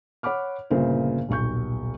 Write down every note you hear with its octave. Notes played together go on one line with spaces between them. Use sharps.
C#5 F#5 B5 D6 F6
G1 A#2 C#3 A#4 C5
D#1 B1 C#6 G6